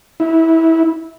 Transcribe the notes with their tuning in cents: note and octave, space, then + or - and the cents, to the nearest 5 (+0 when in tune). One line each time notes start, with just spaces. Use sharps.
E4 -20